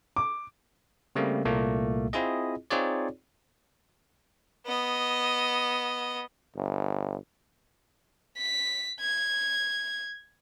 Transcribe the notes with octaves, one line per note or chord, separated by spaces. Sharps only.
D6
C#3 G3 A3 A#3 C4
C2 A#2 A3 A#3
C4 E4 F4 G#4 D#5
C4 D#4 F4 G#4 C#5 D5
B3 D#5
G1
B6
G#6